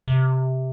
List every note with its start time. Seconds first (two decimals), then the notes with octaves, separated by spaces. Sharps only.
0.08 C3